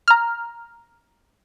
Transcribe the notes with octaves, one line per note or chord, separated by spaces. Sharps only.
A#5 F6